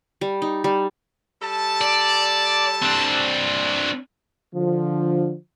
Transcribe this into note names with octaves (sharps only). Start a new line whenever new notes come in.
G3
D#4
G3
G3 A4 A5
D5
C4 D4
D3 F3